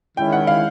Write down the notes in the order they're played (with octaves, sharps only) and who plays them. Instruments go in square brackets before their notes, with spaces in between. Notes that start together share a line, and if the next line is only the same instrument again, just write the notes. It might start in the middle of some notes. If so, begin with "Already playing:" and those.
[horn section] D#3 G#3 C#4 E4 [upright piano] G5
[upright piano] F#5
F5